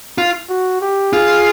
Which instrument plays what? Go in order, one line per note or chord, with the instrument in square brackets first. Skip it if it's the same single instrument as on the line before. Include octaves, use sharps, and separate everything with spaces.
[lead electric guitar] F4
[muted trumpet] F#4
G4
[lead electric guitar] F4 [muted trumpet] G#4